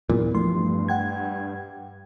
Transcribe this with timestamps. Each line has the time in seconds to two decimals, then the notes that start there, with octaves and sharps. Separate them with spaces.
0.09 E2 G2 A#2 F#3
0.34 F3 A3 C6
0.88 F#5 G5 G#6